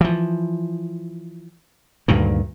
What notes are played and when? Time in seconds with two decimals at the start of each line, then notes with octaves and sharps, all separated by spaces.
0.01 E3 F3
2.08 D2 G2 A#2 D#3